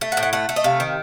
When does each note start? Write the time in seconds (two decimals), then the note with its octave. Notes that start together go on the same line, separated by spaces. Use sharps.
0.01 A3
0.12 F#5
0.17 A2
0.23 F#5
0.33 A3 F#5
0.49 A3
0.56 D#5
0.64 C3 F5
0.80 D#3